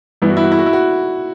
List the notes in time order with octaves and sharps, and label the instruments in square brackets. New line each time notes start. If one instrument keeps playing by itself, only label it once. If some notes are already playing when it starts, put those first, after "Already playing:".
[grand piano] G2 E3 B3 [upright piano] E4
[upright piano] F#4
E4
F#4
E4
F#4
E4
F#4